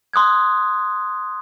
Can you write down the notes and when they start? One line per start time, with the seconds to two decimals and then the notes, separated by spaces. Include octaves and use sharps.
0.13 C6 D#6 F#6 G#6